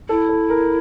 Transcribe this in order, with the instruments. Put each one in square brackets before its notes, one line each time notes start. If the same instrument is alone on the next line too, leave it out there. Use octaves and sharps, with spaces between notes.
[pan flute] E4 [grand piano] A4
[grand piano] A4
A#4